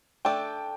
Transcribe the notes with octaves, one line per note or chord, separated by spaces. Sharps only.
A3 D4 A4 G5